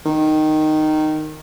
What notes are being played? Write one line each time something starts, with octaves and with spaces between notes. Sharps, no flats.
D#3